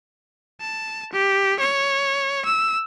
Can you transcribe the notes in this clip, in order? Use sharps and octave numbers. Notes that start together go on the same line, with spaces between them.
A5
G4
C#5
E6